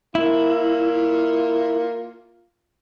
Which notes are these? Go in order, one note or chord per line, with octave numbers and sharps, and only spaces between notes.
A#3 E4 F4